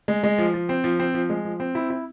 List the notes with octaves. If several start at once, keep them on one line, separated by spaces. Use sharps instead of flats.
G#3
G#3
F3
F3
C4
F3
C4
F3
G#3
F3
C4
E4
E4